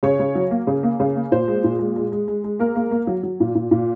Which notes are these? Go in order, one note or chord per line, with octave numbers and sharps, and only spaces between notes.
C#3 C#5
C#3
F#3
A#3
C#3
A#3
C#3
A#3
A#2 C5
G#3
A#2
G#3
G#3
G#3
G#3
G#3
A#3 A#4
A#3
A#3
F#3
F#3
A#2
A#2
A#2